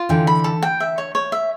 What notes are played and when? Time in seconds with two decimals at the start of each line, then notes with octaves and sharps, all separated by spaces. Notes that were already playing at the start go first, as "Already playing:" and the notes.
Already playing: F4
0.09 D3 E3 G5
0.27 B5
0.44 A4
0.63 G5
0.80 E5
0.98 C#5
1.15 C#5
1.32 E5